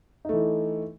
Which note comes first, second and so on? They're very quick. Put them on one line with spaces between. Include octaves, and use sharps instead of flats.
D#4 A3 E3